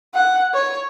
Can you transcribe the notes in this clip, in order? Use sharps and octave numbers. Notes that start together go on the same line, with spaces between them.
F#5
C#5